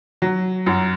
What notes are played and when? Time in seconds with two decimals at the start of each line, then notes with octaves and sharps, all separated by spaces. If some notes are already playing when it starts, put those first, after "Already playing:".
0.22 F#3
0.66 F#2